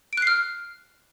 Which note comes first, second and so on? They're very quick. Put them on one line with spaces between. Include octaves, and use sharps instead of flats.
D7 F#6 C7 F6